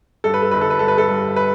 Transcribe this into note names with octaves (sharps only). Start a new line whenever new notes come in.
G2 A4
B4
A4
G1 B4
A4
B4
G2 A4
B4
A4
G2
B4